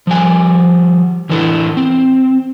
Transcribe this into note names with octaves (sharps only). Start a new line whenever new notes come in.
F3 G3 G#5
A2 E3 A3 D4 E4 A4
C4